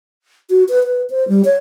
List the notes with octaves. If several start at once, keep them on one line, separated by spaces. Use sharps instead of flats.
F#4
B4
B4
C5
G3
C#5